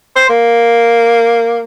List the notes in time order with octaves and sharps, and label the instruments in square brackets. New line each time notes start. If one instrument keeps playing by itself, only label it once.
[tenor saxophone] C5
A#3